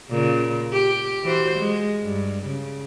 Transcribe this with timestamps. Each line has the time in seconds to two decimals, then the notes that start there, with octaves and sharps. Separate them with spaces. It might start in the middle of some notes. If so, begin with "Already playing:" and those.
0.10 A#2 C#3
0.72 G4
1.24 E3 F#4 C5
1.59 G#3
2.04 G2
2.46 C#3